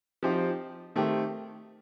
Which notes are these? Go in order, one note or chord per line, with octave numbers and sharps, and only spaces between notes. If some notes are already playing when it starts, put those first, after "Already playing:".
F3 C4 D#4 G4
D#3 A3 C4 G4